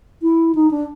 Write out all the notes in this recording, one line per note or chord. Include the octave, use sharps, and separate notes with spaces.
E4
D#4
D4